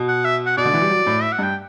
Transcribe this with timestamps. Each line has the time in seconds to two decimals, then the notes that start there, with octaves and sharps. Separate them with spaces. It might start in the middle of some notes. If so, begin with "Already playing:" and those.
Already playing: B2
0.08 F#5
0.25 E5
0.46 F#5
0.57 B2 D5
0.65 D3
0.73 E3
0.81 G3
0.90 F#3
1.06 A2
1.22 E5
1.32 F#5
1.39 G2 G5